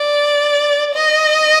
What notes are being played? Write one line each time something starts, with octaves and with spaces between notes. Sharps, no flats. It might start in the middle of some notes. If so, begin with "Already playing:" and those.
Already playing: D5
D#5